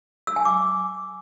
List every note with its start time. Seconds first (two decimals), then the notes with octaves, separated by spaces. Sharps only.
0.27 E6
0.36 G#5
0.45 D6